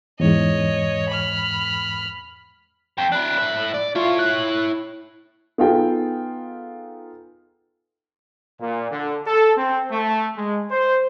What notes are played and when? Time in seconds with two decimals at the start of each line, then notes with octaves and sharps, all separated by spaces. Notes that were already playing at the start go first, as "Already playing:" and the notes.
0.20 E2 G#2 C#5 D#5
1.09 B5 F6
2.98 F2 G5
3.12 D4 E4 F#6
3.39 A2 E5
3.74 D5
3.96 E4 F4 C#5
4.19 F#6
5.58 B3 D#4 F4 G#4 A4 G5
8.60 A#2
8.91 D3
9.26 A4
9.57 C4
9.90 A3
10.37 G#3
10.71 C5